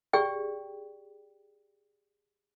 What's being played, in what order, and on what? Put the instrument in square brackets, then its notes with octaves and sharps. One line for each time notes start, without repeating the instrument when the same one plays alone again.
[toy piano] G4 G#4 D5 G5